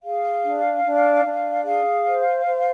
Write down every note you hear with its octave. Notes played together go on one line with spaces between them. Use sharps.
G#4 F5
D4
D4
D4
G#4 F5
C5
C5